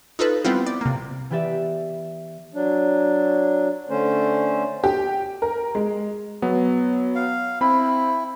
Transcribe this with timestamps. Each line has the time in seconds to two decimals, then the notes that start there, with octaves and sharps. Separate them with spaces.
0.19 D#4 F4 A4 B4
0.45 G3 B3 C4 E4 F4
0.66 D5
0.81 C3 A#3
1.30 E3 B3 G4 B4 D5 E5
2.54 F#3 D4
3.89 D3 A3 C#4 C5
4.84 G4
5.42 A#4
5.75 G#3
6.42 F#3 B3
7.15 F5
7.61 C4 E4 B5